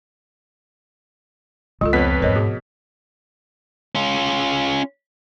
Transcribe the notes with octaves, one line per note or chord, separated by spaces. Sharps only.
C#2 G#3 F4 A4
F2 B3 B4 C#5 B6
E2 G#2 A#4 C#5 D#5
B2 G#4
C#4 F4